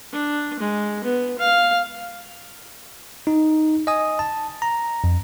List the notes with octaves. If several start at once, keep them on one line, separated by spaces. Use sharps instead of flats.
D4
G#3
B3
F5
D#4
D#5 G#5 D#6
A5
A#5
F2